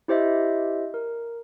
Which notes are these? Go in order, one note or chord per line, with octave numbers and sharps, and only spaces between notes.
E4 G4 C5 D#5 E5
A#4